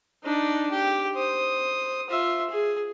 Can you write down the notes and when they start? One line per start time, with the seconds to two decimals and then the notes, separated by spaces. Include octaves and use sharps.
0.24 D4 D#4
0.71 G4
1.15 C5 D#6
2.09 F4 E5
2.50 G#4